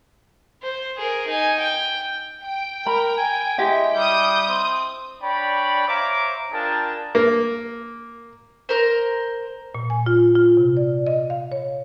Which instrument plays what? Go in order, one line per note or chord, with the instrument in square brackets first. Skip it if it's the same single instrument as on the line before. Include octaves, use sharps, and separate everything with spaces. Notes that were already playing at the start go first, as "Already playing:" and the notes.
[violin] C5
G#4 A#4
D#4 G#5
G5
[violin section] G5
[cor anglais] A#4 [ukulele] B5
[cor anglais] G#5
[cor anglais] G#3 [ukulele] E4 G4 D#5
[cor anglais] G3 [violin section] D#6 G6
[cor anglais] C4
[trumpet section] D4 C#5 D5 G5 B5
C5 C#5 E5 F5 A#5 D6
D4 F4 G#4 A#4 G5 A5
[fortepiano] A#3
[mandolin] A#4 C5
[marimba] A#2
G#5
F4
F4
C3
D5
D#5
F5
C#5